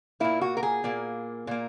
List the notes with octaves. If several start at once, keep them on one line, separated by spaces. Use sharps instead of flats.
A#2 A#3 E4
F#4
A#4
G#4
A#2 A#3
A#2 A#3